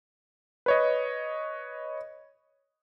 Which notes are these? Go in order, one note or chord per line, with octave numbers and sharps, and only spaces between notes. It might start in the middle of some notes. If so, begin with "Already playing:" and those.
B4 C#5 D#5